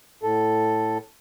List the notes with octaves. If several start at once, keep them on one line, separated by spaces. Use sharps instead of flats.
A2 A4